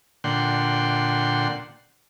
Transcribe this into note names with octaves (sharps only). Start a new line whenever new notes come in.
A#2 D3 F#5 G5 C6